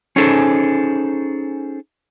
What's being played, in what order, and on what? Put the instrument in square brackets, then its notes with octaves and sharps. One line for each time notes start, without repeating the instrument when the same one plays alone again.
[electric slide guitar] C#4 D#4 G#4 A4 C5